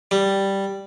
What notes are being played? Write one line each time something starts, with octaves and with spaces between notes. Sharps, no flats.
G3